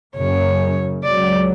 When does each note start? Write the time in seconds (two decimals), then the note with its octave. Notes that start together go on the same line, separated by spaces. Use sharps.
0.16 F#1 F#2 C#3 C#5
1.04 C#2 C#3 F#3 D5